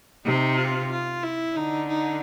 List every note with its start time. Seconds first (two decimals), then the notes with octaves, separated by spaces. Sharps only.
0.25 C3 D#4
0.57 F4
0.91 F4
1.23 E4
1.55 D3 D#4
1.88 D#4